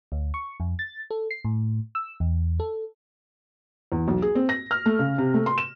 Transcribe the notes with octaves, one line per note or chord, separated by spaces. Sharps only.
D2
C#6
F2
A6
A4
C7
A2
E6
E2
A4
E2
B1
G#4
C4
A#6
F6
A3
C#3
C3
A3
C6
E7